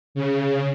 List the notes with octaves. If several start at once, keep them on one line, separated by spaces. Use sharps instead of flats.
C#3